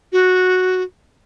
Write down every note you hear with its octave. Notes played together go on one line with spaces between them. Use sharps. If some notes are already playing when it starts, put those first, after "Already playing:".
F#4